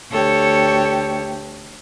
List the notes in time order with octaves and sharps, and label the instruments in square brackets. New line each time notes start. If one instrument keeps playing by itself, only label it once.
[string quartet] D2 G4 [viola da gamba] A4 C#5